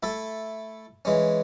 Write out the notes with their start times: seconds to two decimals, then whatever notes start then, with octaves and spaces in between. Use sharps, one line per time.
0.03 A3 E4 A4
1.05 E3 G#3 C#4